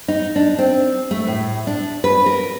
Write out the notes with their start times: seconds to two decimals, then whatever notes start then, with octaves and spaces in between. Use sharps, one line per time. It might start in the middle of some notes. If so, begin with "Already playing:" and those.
0.08 D#4
0.36 D4
0.58 C4
1.11 A3
1.27 A2
1.67 D4
2.04 B4
2.26 A#4